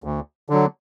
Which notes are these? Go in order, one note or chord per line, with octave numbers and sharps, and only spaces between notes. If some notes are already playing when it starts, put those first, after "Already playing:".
D2
D3 F#3